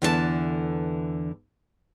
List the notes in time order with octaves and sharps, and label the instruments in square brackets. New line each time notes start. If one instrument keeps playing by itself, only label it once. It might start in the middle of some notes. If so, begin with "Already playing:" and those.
[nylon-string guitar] E2 D3 E3 A4 C5 A5